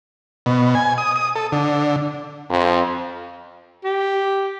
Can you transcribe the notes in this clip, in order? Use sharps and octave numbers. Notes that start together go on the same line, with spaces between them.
B2
G#5
D#6
D#6
A4
D3
F2
G4